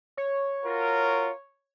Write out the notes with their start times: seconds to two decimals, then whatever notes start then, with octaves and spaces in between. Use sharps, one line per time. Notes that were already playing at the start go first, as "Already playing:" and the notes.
0.17 C#5
0.64 F4 F#4 A#4